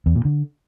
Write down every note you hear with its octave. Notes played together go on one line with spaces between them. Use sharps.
E2
A#2
D3